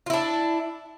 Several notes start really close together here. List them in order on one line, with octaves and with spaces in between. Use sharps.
F4 E4 D4